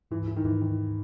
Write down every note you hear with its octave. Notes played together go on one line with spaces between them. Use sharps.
G#2 E3
E3
D#3
G#2 E3
D#3